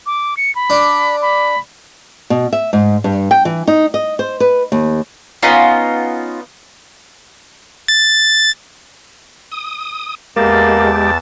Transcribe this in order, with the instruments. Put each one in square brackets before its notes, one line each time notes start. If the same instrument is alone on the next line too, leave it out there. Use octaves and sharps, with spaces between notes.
[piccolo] D6
C#7
B5
[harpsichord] D4
[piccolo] B5
[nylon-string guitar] B2
E5
G#2
G2
G5
E3
D#4
D#5
C5
B4
D#2
[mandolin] B3 C#4 D#4 F4
[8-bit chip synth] A6
[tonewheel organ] D#6
[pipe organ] E2 A5 A6 [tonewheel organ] G#3 G4 [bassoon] A#3